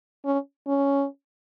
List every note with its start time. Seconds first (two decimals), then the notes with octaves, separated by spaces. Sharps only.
0.25 C#4
0.67 C#4